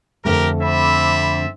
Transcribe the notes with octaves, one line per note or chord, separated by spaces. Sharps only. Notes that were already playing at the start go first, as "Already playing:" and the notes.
F2 D3 A3 G4 A#4
C4 A4 E5 B5 D6